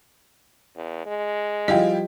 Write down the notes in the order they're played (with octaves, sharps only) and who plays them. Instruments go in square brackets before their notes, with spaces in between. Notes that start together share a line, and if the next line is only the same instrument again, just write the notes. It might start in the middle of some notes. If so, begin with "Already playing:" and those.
[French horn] E2
G#3
[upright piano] F3 G3 [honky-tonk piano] E4 F4 G5 [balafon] D#5